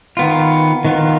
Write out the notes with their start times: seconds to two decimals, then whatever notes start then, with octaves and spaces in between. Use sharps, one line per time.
0.17 D#3 B3 F4
0.85 D#3 B3 F4